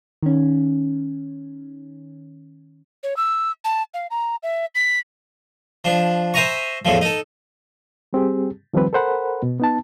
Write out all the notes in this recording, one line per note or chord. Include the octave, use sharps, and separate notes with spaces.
D#3 C#4
C#5
E6
A5
F5
A#5
E5
B6
F3 D4
C5 E5 G#5 A#5 C#6
E2 A2 E3 F3
D#4 A4
G3 C4 G4 G#4
D#3 F3 G3 C4 B4
A4 A#4 C5 F#5 B5
B2
B3 D#4 A5